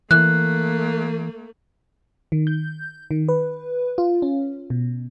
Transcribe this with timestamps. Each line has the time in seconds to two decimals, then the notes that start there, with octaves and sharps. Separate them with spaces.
0.11 E3 A3 A#3 F#6
2.32 D#3
2.47 G6
3.11 D#3
3.29 B4
3.98 F4
4.22 C#4
4.70 B2